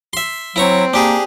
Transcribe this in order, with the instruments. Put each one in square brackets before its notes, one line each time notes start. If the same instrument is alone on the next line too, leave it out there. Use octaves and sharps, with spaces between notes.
[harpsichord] E5 C6
[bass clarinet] F#3 [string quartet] C4 [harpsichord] E4 A#5 C#6
[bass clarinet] A#3 [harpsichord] D4 G4 G#4